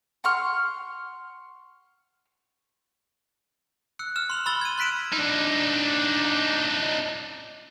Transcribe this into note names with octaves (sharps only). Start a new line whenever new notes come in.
F#5 C6 C#6 F6
E6 F#6 C#7
E6 F6 E7
C6 F7 F#7
B5 C6 E6 A6 G7
G#6 D#7
C6 F#6 B6 D7 E7
D4 D#4